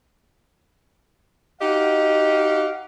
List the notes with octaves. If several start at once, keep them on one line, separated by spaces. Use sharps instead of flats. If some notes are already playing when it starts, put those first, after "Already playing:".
D#4 F#4 G4 D#5 F5 F#5